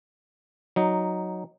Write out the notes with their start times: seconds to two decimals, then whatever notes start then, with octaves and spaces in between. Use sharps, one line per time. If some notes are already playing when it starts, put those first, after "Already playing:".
0.76 F#3 D#4